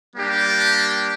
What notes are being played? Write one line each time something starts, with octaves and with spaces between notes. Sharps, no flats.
G3 A#3 D4 G4